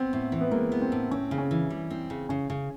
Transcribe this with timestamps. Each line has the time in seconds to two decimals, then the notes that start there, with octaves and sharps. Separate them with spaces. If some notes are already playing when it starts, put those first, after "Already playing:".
Already playing: B3 C4
0.13 A2
0.32 E3
0.41 B3
0.51 G#3 A#3
0.72 B3
0.82 C4
0.92 A2
1.11 C4 C#4
1.31 C#3
1.38 C#4
1.51 E3
1.70 G3
1.90 C4
2.10 C#3
2.29 C#3 C#4
2.50 C#3